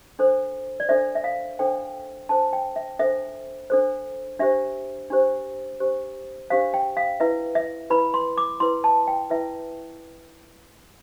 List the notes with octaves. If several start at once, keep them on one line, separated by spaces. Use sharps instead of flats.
D4 A4 C5
D5
D4 A4 C5 E5
E5
F5
D4 A4 C5 G5
D4 A4 C5 A5
G5
E5
D4 A4 C5 E5
D4 A4 C5
D4 G4 C5 E5
D4 G4 C5
D4 G4 C5
D4 G4 C5 F5
G5
F5
E4 B4 E5
E5
E4 B4 B5
C6
D6
E4 B4 C6
A5
G5
E4 B4 E5